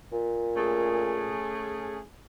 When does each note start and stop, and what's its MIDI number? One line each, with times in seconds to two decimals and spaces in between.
0.12 1.44 46
0.56 2.00 57
0.56 2.00 61
0.56 2.00 68